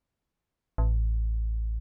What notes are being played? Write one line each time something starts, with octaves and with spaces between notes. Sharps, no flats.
A1